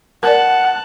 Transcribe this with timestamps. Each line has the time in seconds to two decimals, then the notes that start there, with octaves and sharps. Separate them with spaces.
0.23 A#4 D5 F#5 A5 F#6